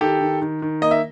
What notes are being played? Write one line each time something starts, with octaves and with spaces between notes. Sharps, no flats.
D#3 G4 A4
D#3
D#3
D#3
A#3 D#5
E5